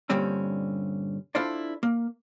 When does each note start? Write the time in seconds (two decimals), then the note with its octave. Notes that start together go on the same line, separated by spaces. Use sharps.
0.10 G2 A#2 D3 G3 C4 C#4
1.35 D4 E4 F4 A4 C5 D5
1.83 A#3